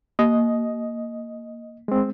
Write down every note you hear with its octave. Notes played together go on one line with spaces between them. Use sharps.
A#3 D#5
G#3 C4